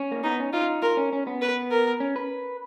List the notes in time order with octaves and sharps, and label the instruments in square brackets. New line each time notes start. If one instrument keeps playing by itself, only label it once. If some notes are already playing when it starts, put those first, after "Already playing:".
Already playing: [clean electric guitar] C#4
A#3
[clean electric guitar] B3 [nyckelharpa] D#4
[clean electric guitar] C#4
[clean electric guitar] D#4 [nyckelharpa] F4
[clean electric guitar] F4 [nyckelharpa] A#4
[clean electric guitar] C#4
C#4
B3
[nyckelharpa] B4
A#4
[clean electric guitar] C#4
B4